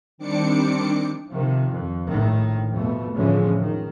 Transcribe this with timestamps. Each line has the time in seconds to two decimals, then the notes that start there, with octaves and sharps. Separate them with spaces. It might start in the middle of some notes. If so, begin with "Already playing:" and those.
0.18 D#3 G3 C4 D4 D6 C#7
1.31 C3 D#3 F3
1.71 F2
2.08 A#1 A2 D#3
2.72 F2 B2 A3
3.15 A2 D3 E3 F3 G#3 C#4
3.59 D#3